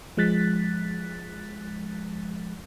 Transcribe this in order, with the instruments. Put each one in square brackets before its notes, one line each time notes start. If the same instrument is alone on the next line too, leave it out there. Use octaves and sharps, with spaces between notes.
[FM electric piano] F3 G#3 F#6 A6 B6